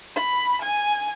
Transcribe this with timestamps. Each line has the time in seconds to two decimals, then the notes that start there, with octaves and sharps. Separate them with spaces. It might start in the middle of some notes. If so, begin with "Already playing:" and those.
0.16 B5
0.62 G#5